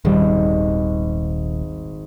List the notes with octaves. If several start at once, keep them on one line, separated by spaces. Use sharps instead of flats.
D#1 G#1 G3